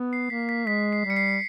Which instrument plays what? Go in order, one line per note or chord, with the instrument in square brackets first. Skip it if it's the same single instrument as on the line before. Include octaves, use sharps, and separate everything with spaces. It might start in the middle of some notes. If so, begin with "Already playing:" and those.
Already playing: [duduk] B3
[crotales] C7
[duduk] A#3 [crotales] B6
[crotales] B6
[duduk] G#3 [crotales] B6
[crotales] C7
[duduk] G3
[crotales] C#7
C7